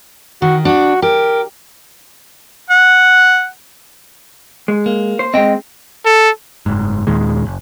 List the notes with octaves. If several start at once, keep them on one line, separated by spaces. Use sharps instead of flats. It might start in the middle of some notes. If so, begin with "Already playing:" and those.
D#3 F#4
D4 F#4
G4 A#4
F#5
G#3
A#3
C5
G#3 C4 D#5 G5
A4
F#1 G#2
D#2 A#2 D#3 G#3
F#1